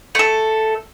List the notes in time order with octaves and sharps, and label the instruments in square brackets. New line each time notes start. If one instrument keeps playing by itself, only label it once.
[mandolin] A3 A4